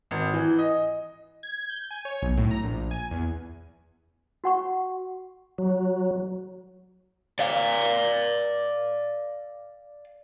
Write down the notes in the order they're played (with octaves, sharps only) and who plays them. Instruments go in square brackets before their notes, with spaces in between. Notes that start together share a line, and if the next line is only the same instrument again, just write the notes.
[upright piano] G#1
E3
D#5
[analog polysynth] G#6
G6
G#5
C#5
B1
A2
A#5
A#1
G#5
E2
[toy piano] F#4 F#5 C#6
[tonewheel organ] F#3
[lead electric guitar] D5 F5